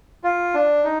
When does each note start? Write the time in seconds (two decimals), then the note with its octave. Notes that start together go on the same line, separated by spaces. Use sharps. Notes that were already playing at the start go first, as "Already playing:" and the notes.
0.24 F4
0.54 D4
0.84 D#4